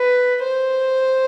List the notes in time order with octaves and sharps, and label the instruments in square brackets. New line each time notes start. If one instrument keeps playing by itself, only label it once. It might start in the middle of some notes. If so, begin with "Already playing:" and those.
Already playing: [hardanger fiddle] B4
C5